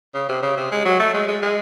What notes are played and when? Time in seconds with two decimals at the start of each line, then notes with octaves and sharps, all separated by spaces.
0.14 C#3
0.29 C3
0.43 C#3
0.57 C3
0.72 G#3
0.85 F#3
1.00 A3
1.14 G#3
1.28 G#3
1.42 G#3